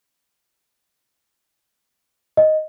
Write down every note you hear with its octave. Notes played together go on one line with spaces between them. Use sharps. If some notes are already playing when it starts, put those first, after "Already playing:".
D#5